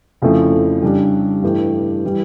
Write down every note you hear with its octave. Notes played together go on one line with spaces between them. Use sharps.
F2 C#3 F3 A3 E4
C#3 G3 D4 G4
G2 E3 A3 E4 G4
E3 G3